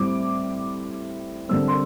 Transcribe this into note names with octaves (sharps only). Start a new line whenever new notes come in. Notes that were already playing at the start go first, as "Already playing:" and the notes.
Already playing: A2 G3 C4 D6
D3 G3 C4 E6
C6